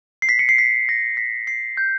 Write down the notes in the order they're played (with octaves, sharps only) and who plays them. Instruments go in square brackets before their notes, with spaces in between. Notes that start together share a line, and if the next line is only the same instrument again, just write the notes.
[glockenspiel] C7
B6
C#7
C7
B6
A#6
B6
C7
G6